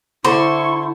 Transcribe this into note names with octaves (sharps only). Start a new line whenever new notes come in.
D3 E4 C5 C#6